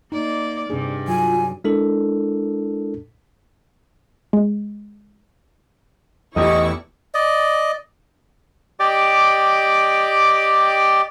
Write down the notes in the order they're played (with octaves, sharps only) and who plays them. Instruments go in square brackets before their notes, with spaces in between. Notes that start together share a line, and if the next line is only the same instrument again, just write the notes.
[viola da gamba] A#3 D5 [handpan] D#4
[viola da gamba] G2 [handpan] C3 D4 G#4
[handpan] F#3 [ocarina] F4 [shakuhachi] G#5
[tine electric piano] G#3 D4 E4 A4 A#4
[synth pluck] G#3
[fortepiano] A1 G4 [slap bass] E2 [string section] E4 D5 C#6 [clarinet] D#5
[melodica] D5 D#5
[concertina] G4 D5 D#5 G5 D6